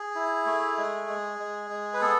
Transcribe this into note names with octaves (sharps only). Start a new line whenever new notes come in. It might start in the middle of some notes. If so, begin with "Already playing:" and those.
Already playing: G#4
E4
A3
G#3
G#3
G#3
G#3
B4
B3 A4